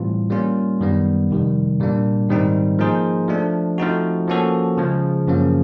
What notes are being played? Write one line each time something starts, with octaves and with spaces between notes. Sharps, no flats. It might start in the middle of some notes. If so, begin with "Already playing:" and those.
Already playing: A2 E3 G3 C4 F4
G3 A#3 C#4 F4
F#2 D#3 G3 B3
F2 C3 D#3 G3
A#2 G3 A#3 D4
G#2 D#3 G3 C4 D#4
F3 A#3 D#4 G#4 C5
F3 A3 D4
F3 A3 C4 D#4 F#4
F3 A#3 C#4 F#4 A4
C#3 F3 G#3
F#2 C#3 F3 A#3 C#4